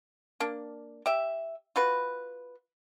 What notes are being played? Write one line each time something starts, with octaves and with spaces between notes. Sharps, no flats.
A#3 D4
G4 E5
F4 F#4 B4